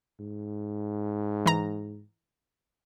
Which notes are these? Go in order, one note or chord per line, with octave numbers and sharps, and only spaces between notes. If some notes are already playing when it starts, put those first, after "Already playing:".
G#2
E3 A#5